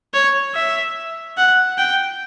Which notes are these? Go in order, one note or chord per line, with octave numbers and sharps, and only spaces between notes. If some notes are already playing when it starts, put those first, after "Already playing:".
C#5
E5
F#5
G5